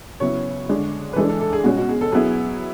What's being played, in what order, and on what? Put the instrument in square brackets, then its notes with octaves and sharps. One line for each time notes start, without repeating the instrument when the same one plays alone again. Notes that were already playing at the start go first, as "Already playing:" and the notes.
[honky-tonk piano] C#3 F#3 B3 E4 [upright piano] C#5
[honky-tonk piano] D3 G#3 D4
[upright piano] B4
[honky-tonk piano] E3 G#3 D4 [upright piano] A4
[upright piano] A4
A4
G#4
[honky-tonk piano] B2 G#3 C#4 [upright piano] F#4
[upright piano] F#4
G#4
A4
[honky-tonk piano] F#3 B3 E4 [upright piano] G#4